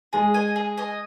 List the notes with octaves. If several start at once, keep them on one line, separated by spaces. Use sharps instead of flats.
G#3 G#4
D#5 G#5
G#4
D#5 G#5